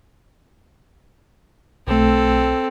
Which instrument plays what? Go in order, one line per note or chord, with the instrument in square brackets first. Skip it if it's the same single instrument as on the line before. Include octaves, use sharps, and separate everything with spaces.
[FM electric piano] B1 A3 [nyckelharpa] C4 A4